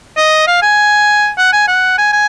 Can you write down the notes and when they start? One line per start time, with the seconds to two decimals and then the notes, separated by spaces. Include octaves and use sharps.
0.17 D#5
0.47 F5
0.62 G#5
1.38 F#5
1.53 G#5
1.67 F#5
1.98 G#5
2.13 G#5